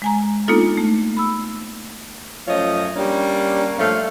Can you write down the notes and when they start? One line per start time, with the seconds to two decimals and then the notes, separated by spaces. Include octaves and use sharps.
0.02 G#3 G#5 A#5
0.48 A#3 B3 D4 D#4 F4 A4
0.77 A3
1.17 B5 E6
2.47 F#2 F3 A3 F4 C#5 D#5
2.96 G3 A#3 C#4 D4
3.79 G2 F3 A3 C#5 F5